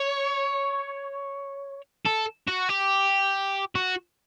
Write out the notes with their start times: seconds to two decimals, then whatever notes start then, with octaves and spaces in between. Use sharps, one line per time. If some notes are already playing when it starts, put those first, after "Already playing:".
Already playing: C#5
2.06 A4
2.48 F#4
2.69 G4
3.75 F#4